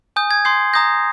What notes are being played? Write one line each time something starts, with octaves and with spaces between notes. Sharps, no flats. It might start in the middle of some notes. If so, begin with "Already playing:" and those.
G#5 D#6 G6
G#6
C6 D#6 G6 C7
A#5 D#6 G6 A#6